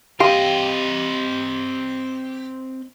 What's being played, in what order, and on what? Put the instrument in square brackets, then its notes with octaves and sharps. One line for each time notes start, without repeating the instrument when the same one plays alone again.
[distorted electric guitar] C4 D#5 [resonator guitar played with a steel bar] G4 [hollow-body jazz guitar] F5 G5 C6